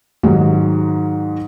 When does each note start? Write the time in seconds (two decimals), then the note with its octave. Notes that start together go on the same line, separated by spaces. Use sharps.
0.23 G#2 D#3 F#3 G#3